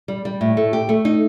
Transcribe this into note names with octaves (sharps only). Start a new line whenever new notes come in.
G3
G3
A2
A3
G4
A3
D#4